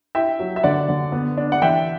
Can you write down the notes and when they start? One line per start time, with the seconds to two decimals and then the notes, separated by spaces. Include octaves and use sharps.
0.15 E4 E5 G5
0.40 F#3
0.56 E5
0.63 D3 D5 F#5
0.89 D3
1.12 B3
1.37 D4
1.52 F#5
1.62 E3 E5 G5